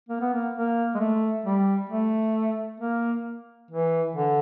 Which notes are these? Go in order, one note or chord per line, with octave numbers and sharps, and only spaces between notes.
A#3
B3
A#3
A#3
G#3
A3
G3
A3
A#3
E3
D3